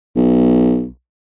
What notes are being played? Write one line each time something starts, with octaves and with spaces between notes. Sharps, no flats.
B1